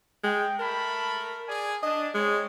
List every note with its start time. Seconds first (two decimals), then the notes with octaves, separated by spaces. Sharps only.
0.24 G#3 G5
0.59 A3 A#4 A5 B5
1.47 G#4 D5 G#5
1.83 D4 D#5
2.14 G#3 C4 C#5